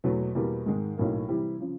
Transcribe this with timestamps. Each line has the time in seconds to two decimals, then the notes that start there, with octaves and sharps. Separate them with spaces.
0.04 E2 B2 F#3 A3
0.35 E2 B2 G3 A#3
0.66 G#2 D#3 G#3
0.97 B1 A2 F#3 A#3
1.29 C3 E3 G3 C4 E4
1.60 C#3 F3